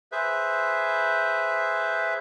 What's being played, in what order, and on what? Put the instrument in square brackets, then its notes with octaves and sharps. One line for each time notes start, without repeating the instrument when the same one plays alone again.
[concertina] G#4 B4 C5 E5